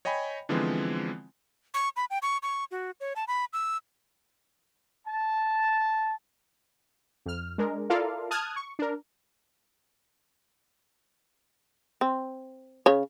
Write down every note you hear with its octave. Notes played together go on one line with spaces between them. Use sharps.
C#5 D#5 G5 G#5 B5
D3 E3 F3 G#3 B3 C4
C#6
B5
G5
C#6
C#6
F#4
C#5
A5
B5
E6
A5
F2 F6
G#3 D4 A#4
E4 F4 A4 A#4 D5 F5
A5 D#6 F6 F#6 G#6
C#6
D4 A#4
C4
C#3 C#5